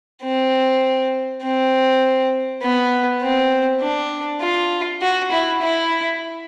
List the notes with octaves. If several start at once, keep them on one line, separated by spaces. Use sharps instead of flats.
C4
C4
B3
C4
D4
F4
F#4
E4
E4